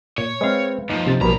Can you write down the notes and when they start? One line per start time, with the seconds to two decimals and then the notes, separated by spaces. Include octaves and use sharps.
0.18 A#2 C#5
0.41 G#3 C4 B4 E5 F5
0.90 D#2 F3 D#4
1.06 C#2 C3 A6
1.21 A#1 G2 B2 G3 A#4 A#5 B5